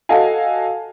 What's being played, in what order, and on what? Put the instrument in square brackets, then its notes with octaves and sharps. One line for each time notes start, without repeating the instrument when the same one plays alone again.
[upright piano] F#4 A4 D#5 F5 G#5